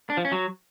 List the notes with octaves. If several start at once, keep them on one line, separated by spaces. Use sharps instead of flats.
D4
F3
C#4
F#3